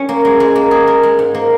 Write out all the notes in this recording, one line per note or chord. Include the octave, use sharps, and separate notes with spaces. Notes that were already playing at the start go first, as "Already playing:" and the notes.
Already playing: C#4
A#3
G#3
G#3
A#3
G#4
A#4
G#3
G#2
A#3